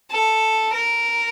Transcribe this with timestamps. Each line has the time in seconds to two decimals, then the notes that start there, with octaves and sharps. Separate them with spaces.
0.11 A4
0.74 A#4